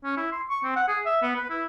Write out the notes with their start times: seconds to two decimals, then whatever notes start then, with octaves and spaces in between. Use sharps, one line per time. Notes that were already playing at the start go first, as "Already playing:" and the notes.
0.04 C#4
0.17 E4
0.32 C6
0.50 C#6
0.64 C4
0.76 F#5
0.88 G#4
1.05 E5
1.22 B3
1.36 B4
1.50 E4